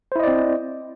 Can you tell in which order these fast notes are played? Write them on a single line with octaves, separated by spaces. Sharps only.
C5 E4 D#5 D5 C4